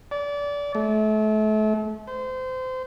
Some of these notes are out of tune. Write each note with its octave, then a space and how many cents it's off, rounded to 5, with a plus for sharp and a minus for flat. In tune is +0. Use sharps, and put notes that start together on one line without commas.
D5 -25
A3 -35
C5 -25